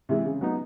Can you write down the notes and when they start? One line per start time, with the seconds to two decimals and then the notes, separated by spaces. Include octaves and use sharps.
0.09 C3 E3 G#3
0.24 C#3
0.41 F#3 B3 D#4